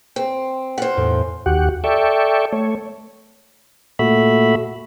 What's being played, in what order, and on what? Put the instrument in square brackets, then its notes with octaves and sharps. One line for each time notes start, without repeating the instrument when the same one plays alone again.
[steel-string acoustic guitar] C4
[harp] F4 C#5 [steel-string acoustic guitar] C5 F#5
[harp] E2 A2 A4
[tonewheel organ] D#2 F#4 G4 F#5
A4 D5 E5 G5 C#6
A3 C#5
A#2 A3 F#4 E5 B5